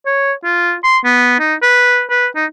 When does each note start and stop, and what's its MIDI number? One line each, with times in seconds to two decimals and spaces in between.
0.06 0.33 73
0.44 0.75 65
0.84 0.98 84
1.05 1.35 59
1.40 1.54 63
1.62 2.04 71
2.11 2.27 71
2.36 2.46 63